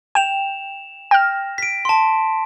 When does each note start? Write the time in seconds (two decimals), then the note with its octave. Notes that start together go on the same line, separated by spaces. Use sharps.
0.15 G5 E7 F7
1.11 G5 F6 A#6
1.58 B6 D7
1.85 A5 C6